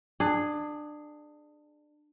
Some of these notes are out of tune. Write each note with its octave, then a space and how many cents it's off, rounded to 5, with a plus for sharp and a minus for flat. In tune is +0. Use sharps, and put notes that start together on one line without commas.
D4 +25 G#4 +0